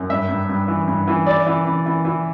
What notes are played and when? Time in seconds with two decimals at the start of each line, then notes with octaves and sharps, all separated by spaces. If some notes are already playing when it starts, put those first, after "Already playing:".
Already playing: F#2
0.10 G2 E5
0.29 G2
0.49 G2
0.68 E3
0.88 G2
1.07 E3
1.27 E3 D5
1.46 E3
1.65 E3
1.86 E3
2.05 E3